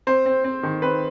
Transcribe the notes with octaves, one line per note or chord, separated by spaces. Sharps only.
C4 C5
C4
C4
D#3
C4 B4